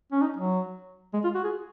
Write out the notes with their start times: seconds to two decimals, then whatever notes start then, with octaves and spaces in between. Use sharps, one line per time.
0.12 C#4
0.22 D#4
0.37 F#3
1.13 G#3
1.24 F4
1.35 F#4
1.44 G#4